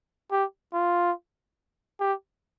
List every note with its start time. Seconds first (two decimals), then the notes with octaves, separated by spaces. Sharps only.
0.31 G4
0.73 F4
2.00 G4